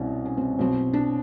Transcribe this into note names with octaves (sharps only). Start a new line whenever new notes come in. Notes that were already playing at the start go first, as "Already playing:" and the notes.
Already playing: C2 B2 C4 C#4
C#4
C4
B1 B2 F#3 C4
D4